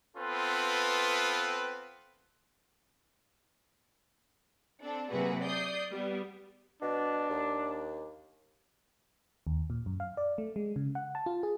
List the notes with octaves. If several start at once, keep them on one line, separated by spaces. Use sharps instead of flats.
B3 C4 F4 A4 B4
C4 D4 A4
C3 F#3 A#3 F#4 G#4 B4
D5 D#6 G6 C7
G3 B3
B2 D4
D#2
D#2
A#2
F#2
F5
D5
A3
G#3
C#3
F#5
A5
F4
G#4